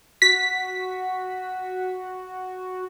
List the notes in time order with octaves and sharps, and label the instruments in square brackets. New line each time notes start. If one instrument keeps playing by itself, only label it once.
[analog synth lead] F#4 [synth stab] B6